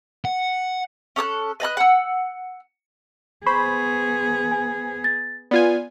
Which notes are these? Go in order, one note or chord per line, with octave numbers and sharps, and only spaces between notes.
F#5
C#4 A4 D#6 F#6
B4 D#5 B5 F#6
F#5 E6
B3 G#4 C5 B5 C#6
G#5
A6
B3 F4 D5 G#5